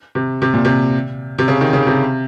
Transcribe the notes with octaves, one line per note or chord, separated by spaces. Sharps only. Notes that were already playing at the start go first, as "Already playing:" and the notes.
C3
C3
A#2
C3
C3
C#3
D#3
C#3
C3